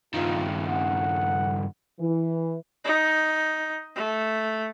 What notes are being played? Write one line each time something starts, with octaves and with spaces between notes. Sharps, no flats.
G2 D#3 F4
F#5
E3
D#4
A3